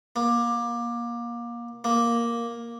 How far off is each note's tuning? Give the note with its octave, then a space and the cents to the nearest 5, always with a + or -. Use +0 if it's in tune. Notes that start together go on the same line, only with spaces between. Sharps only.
A#3 +25
A#3 +5